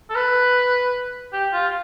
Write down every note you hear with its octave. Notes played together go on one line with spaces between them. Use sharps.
A4
B4
G4
F4